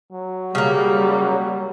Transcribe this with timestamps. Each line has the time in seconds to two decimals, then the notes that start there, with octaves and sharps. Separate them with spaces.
0.13 F#3
0.55 C#3 G3 A#3